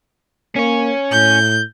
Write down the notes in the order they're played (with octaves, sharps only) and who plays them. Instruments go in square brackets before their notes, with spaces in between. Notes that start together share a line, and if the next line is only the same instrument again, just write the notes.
[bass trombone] A#3 [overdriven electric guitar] C#4 C#5
[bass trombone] A2 [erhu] G6